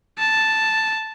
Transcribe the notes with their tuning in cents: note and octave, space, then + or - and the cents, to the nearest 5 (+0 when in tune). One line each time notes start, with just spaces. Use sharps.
A5 +0